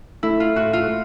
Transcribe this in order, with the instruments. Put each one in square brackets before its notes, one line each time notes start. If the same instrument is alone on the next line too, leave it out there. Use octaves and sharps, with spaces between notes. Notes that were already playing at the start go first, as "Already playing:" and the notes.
[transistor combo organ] A3 [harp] E4
[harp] F4
[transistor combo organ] A2 [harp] F#4
[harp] F4